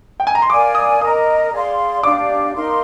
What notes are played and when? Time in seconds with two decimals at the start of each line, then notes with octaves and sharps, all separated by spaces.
0.20 G5
0.27 G#5
0.35 A#5
0.42 C6
0.49 A#4 D5 F5 G#5 D6
0.75 D#6
1.01 A#4 D#5 A#5 D#6
1.52 G#4 D5 F5 C6
2.03 D4 G4 D5 F5 D6
2.54 D#4 A#4 F5 C6